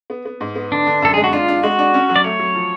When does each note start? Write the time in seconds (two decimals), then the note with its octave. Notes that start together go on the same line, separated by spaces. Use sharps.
0.10 B3
0.25 B3
0.41 G#2
0.56 B3
0.72 D3 D4
0.87 D3
1.02 F#2 A4
1.14 G#3 G#4
1.24 F#4
1.33 D4 F4
1.48 D4
1.63 G#3 F#4
1.79 D4
1.94 C#4
2.09 F#3
2.16 D5
2.24 A3 C#5
2.39 F#3
2.55 F3